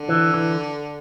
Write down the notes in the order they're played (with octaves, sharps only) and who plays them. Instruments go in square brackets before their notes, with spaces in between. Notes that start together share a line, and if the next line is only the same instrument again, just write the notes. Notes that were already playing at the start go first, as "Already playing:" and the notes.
Already playing: [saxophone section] D3
[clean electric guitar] E3
E3